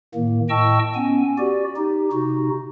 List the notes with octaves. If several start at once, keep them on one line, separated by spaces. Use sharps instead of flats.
A2 D#3 A#3
A2 D#5 G5 A5 C#6 E6
B3 C#4 G#5
F#4 G4 D5
D#4 G4
C3 D#4 F#4